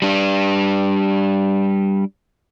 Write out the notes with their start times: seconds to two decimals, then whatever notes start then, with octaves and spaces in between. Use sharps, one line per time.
0.02 G3 D4